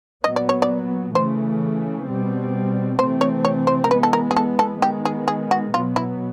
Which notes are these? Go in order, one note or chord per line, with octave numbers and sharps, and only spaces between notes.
A#2 F#3 B3 D#5
D5
C#5
D5
C#3 E3 A3 C5
B2 G3 C4
C3 E3 A3 C4 C5
C#5
C#5
C5
A#4
E3 G#3 B3 B4
A4
A#4
G#4
A4
A4
D#3 G#3 B3 G4
G#4
G#4
F#4
B2 F#3 B3 F4
E4